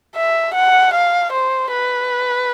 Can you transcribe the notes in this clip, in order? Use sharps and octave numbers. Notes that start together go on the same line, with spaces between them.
E5
F#5
F5
C5
B4